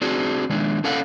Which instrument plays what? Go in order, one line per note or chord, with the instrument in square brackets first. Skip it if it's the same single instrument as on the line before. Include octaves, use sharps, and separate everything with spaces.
[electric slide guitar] C4 D4 F#4 G#4
D#3 G#3 D4
C#4 A4 C#5 F5 F#5